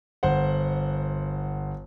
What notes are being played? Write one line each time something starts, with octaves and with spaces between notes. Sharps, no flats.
G1 C5 F#5